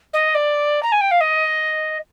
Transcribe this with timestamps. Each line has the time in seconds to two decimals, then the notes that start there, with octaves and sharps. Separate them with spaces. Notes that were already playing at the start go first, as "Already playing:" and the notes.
0.13 D#5
0.35 D5
0.83 A#5
0.92 G#5
1.01 G5
1.11 F5
1.21 D#5